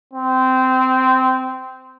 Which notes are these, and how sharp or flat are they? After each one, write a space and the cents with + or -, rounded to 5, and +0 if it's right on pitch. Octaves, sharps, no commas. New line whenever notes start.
C4 -15